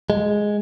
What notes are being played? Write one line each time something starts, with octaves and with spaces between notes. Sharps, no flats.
G#3